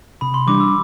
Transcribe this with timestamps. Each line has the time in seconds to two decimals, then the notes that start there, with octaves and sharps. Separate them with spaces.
0.21 C3 B5
0.34 C6
0.47 E3 G3 D4 D6
0.60 E6